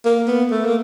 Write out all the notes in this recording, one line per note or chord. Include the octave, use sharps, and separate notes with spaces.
A#3
B3
A3
A#3